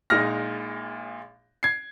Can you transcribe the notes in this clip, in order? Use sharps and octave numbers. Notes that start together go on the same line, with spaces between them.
A#1 A#2 G#3 D#4 F6 A#6
G#6 C7